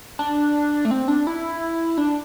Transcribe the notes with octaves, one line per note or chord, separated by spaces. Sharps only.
D4
A3
C4
D4
E4
D4